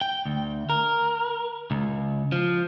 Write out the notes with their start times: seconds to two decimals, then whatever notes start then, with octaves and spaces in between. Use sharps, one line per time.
0.01 G5
0.25 D2
0.70 A#4
1.71 C#2
2.32 F3